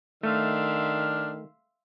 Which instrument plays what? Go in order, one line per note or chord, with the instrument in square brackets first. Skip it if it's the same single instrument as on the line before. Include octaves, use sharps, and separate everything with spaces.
[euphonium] D#3 [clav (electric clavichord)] A3 [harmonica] D4 F6 [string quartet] E5 F5 C6